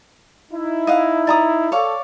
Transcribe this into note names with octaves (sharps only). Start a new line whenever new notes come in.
D#4 E4
D#5 F5 F#5
D5 A#5 D#6
A4 C#5 D5 F5